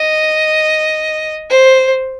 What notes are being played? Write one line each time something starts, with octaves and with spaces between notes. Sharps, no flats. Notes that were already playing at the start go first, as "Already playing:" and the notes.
Already playing: D#5
C5